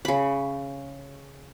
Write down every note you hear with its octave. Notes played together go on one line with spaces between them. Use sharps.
C#3 B5